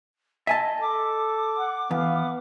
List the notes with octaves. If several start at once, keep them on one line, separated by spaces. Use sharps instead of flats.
D#5 E5 G#5 A5
A4 D6
F#5
E2 B3 F5